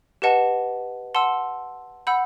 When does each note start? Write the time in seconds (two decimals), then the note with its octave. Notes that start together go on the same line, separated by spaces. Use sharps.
0.22 G4 B4 D#5 F#5 A5
1.15 F#5 A5 C6 E6
2.07 F#5 B5 E6 G6